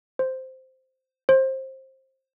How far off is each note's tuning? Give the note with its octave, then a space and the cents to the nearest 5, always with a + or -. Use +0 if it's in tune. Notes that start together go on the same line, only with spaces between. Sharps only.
C5 -5
C5 +20